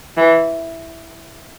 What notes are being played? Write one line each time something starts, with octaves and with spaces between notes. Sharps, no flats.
E3